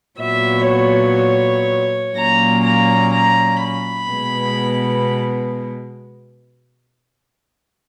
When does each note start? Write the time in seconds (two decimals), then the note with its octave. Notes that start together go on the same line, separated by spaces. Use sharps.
0.20 A#2 F#3 B3 E5
0.69 C#5
2.15 A#2 F#3 A#3 C#4 A#5
2.65 A#5
3.13 A#5
3.62 B5
4.11 B2 G#3 B3